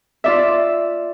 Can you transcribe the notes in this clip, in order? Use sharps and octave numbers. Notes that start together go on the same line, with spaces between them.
F4 D5 E5